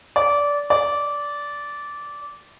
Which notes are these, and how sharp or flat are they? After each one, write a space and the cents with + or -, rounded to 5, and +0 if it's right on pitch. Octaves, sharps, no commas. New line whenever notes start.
D5 -20
D5 -15